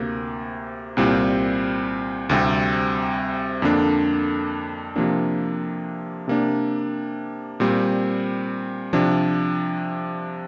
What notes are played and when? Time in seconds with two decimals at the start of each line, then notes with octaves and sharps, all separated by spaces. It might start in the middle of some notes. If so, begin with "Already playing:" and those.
Already playing: D2 C3 A#3
0.97 C2 A#2 G3 C4
2.29 D2 C3 G3 C4
3.62 F2 D3 A#3 D4
4.96 C3 F3 A#3 D4
6.28 C3 A#3 D4
7.60 A#2 G3 C4
8.93 C3 F3 D4